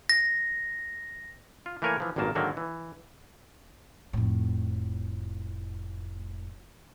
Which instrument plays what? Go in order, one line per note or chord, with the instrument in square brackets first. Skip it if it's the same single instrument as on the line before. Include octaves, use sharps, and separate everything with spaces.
[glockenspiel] A#6
[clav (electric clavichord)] F4
E3 A3 A#3 A#4 C#5 G#5
E3 F3
G#1 G2 A#2 F#3 A#3 A5
G#2 D3 D#3 F#3 A#3
E3
[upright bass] F1 A2